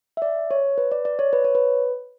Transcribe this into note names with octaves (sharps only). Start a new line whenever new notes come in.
E5
D5
C#5
B4
D5
D5
C#5
B4
C#5
B4